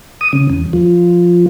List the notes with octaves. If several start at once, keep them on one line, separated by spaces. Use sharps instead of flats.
D#6
C#3
E2
F3